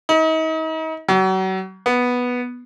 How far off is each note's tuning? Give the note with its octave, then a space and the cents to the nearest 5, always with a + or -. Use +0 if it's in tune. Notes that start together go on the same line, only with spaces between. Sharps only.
D#4 +40
F#3 +35
B3 -5